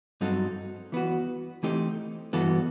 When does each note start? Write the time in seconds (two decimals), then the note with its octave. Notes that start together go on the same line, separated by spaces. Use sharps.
0.21 G2 F#3 C4 D#4 A4
0.92 E3 B3 F#4
1.63 E3 A3 C4 D#4 G4
2.33 G2 E3 B3 F#4 A4